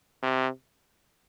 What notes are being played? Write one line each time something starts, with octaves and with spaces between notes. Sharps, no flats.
C3